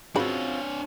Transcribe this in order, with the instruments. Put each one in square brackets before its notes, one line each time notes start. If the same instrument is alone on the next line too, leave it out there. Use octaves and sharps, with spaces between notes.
[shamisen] C#3 B4 B5 [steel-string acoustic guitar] C4 F4 F#4 [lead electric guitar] D4 C#5